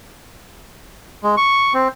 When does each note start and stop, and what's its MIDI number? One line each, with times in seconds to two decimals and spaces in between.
1.23 1.35 56
1.37 1.73 85
1.74 1.88 60